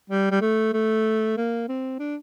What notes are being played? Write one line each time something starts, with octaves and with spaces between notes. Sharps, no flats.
G3
G3
A3
A3
A#3
C4
D4